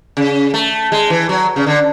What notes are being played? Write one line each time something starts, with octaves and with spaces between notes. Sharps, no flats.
C#3
A3
G#3
E3
F#3
C#3
D3